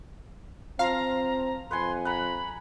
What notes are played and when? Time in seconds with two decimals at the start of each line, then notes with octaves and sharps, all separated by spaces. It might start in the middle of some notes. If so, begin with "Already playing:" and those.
0.79 F3 C4 F5 A#5
1.71 F2 B4 F#5 G#5 C6
2.05 F#5 A#5 B5